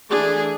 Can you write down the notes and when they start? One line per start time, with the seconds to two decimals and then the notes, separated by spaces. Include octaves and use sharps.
0.09 E3 A3 D4 G#4